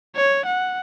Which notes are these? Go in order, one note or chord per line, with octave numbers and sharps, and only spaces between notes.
C#5
F#5